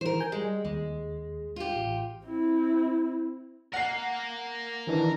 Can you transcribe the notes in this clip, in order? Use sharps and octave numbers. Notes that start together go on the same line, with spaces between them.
D#3 E3 A#4 C5
G#5 G6
G3 G#3
D#2 G#3
F4 G4
A1
C4 E4
A#4 F5 F#5 C7
D#3 E3 D4